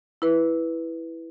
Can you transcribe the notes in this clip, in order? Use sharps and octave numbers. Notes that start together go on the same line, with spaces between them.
E4 B4